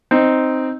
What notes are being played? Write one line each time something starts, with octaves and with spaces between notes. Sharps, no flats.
C4 D#4